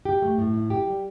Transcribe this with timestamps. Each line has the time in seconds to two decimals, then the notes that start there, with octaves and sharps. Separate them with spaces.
0.05 G4
0.22 A3
0.38 A2
0.54 E4
0.70 G4
0.87 G3